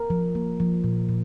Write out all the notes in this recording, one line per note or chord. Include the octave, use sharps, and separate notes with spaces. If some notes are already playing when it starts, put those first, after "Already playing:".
Already playing: A#4
F3
A#3
F3
A#2
A#2